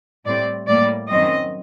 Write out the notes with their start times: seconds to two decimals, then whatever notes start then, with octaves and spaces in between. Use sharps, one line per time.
0.25 A2 G3 C4 D5
0.67 A2 G3 A#3 D5
1.09 F#2 D#3 F#3 C4 D#5